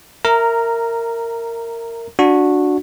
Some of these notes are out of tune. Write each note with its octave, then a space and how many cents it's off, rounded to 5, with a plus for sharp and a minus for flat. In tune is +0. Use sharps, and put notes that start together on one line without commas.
A#4 -15 E5 +0 A#5 +0
D4 +0 F#4 -15